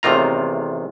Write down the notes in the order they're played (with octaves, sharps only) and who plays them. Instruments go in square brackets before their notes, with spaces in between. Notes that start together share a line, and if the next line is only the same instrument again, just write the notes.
[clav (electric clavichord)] A1 E2 C3 D#3 F4 A#5